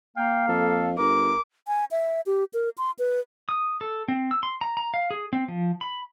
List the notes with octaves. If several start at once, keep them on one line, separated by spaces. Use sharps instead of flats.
A#3 F5 G5
F2 A4
G1 A#4 D6
G#5
E5
G4
A#4
C6
B4
D#6
A4
C4
E6
C6
A#5
A#5
F5
G#4
C4
F3
B5